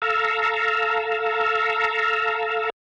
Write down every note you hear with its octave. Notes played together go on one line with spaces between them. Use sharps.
A4 F5 A#5 E6